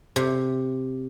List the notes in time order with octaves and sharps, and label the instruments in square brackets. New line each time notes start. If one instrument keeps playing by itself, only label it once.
[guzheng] C3